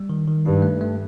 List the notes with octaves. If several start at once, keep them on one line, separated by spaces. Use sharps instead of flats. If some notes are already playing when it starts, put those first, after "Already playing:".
Already playing: G3
D#3
D#3
G2 D#4
A3
A3